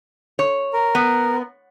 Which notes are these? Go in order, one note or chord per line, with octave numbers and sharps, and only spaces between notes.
C#5
A#4
B3